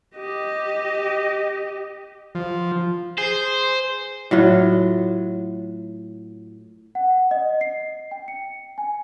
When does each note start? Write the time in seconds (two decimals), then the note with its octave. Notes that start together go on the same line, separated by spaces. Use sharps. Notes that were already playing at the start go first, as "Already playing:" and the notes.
0.15 G4 D#5
2.35 F3
3.18 G#4 C5
4.31 A2 F#3 F4
6.95 F#5
7.31 D#5
7.61 C7
8.11 G5
8.28 C#7
8.78 G#5